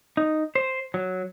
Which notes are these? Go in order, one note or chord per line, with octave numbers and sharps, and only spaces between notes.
D#4
C5
F#3